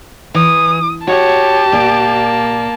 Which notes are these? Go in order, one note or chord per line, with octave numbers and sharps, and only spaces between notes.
E3 D#6
F#4 G4 C#5 A5
A#2 A#3 D5